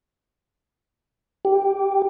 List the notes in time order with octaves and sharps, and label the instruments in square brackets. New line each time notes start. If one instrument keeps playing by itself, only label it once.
[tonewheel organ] G4